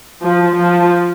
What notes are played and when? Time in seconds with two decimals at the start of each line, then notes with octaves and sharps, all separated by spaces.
0.22 F3
0.56 F3